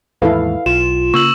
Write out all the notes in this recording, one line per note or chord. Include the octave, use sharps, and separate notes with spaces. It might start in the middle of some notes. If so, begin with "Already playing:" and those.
D#2 G#2 E3 E4 A4 B4 F5
B1 F4 E7
C#3 A#3 C#6 E6 F#7